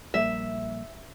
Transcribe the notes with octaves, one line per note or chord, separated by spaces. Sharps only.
A#1 G3 A#3 E5